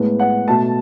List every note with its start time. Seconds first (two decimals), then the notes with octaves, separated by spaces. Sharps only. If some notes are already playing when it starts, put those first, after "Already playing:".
Already playing: A2 G#3 B3
0.19 F#5
0.47 B2 A3 A5